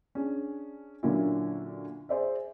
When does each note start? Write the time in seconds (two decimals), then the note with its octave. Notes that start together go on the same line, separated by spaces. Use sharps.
0.15 C#4 D4 G#4
1.03 A#2 D3 F#3 A#3 C#4 E4
2.09 G#4 C5 D5 E5